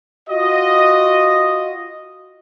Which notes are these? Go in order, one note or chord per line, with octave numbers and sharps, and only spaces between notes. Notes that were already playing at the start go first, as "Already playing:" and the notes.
F4 F#4 D#5